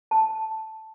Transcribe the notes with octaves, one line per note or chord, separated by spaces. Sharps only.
A5